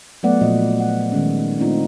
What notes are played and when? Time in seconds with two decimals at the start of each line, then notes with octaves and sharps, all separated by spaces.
0.23 F#3 A3 B3 D5 F#5
0.41 A#2 F3 D#5
0.80 F#5
1.12 D#3 G#3 C#4
1.58 A3 C4 D4 D#4 F4